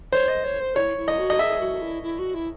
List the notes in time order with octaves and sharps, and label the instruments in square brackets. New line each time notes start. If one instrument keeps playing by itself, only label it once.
[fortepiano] C5 [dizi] C#5
[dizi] D#5
C#5
C5
[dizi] E4 [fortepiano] C#5
[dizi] E4
[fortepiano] D#5
[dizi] F#4
[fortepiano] D#5
[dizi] G#4 [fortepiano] E5
[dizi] F#4
E4
E4
F#4
E4